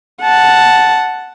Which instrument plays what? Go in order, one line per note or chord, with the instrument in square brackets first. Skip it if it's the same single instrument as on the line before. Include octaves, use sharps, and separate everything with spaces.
[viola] F#5 A5